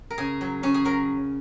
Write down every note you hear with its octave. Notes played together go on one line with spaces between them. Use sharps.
A#4
C#3 G#4
F#3
C#3 C#4
G#4
F#3 A#4